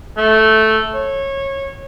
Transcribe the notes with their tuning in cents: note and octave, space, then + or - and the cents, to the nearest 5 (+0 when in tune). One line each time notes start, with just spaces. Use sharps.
A3 -5
C#5 -20